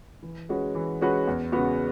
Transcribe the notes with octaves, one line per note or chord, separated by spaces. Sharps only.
E3
G#3 C#4 F#4 B4
E3
G#3 C#4 F#4 B4
E2
C#3 G#3 B3 F#4